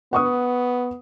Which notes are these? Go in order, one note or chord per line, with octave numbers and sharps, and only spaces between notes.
B3 F#5 C#6 D#6